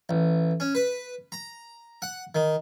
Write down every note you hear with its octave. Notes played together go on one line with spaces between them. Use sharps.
A1
C#4
B4
A#5
F#5
D#3